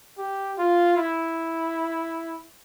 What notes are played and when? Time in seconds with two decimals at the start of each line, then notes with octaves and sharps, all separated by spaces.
0.18 G4
0.58 F4
0.97 E4